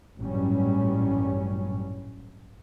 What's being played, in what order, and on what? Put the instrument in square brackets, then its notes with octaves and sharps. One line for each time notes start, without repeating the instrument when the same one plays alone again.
[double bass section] A1 G2 A#2 F#3 G3 C#4